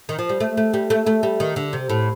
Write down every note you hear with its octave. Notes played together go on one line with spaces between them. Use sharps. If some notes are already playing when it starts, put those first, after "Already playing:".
D#3
F3
G3
A3
A3
G3
A3
A3
G3
D#3
D3
C3
A2